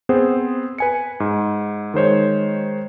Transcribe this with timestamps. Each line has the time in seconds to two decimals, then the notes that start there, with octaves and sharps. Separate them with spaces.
0.09 B3 C4 G#4 C5
0.78 B4 G#5 C#7
1.20 G#2
1.94 D#3 G#3 C5 C#5